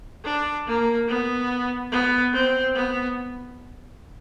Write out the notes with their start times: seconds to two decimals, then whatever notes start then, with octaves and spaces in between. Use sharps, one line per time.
0.25 D4
0.67 A#3
1.08 B3
1.92 B3
2.33 C4
2.75 B3